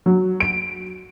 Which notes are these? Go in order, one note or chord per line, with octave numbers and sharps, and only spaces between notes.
F#3
D7